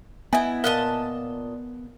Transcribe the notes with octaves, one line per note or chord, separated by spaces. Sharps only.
B3 E4 D#5 E5 G#5
A#2 A#4 D#5 F5 A5 F#6 G7